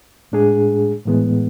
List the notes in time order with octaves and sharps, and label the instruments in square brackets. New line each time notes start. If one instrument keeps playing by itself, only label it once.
[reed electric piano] A2 G#3 D4 G#4
A2 E3 G#3 B3